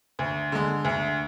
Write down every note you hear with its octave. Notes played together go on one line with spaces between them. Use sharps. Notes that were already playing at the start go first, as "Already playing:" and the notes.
D2
D3 G#3
D2